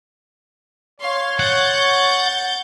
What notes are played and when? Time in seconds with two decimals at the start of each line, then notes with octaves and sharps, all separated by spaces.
1.00 C#5 F5 C6
1.39 F#5 G6 A6